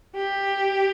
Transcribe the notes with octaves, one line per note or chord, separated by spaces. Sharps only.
G4